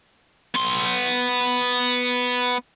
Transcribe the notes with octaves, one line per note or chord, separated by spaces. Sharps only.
B3 C6